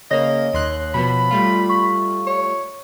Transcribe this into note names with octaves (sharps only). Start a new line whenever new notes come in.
C#3 A#3 C#5 D#5 A#6
D#2 C6 F#6
B2 F3 B3 B5
G3 A3 F4
C#6
C#5